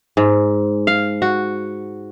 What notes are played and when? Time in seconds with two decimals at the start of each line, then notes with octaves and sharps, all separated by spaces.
0.17 G#2
0.87 F5
1.22 F#4